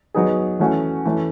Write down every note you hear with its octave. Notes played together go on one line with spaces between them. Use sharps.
F#3 B3 D#4 G#4
E3 A3 C#4 F#4
E3 A3 C#4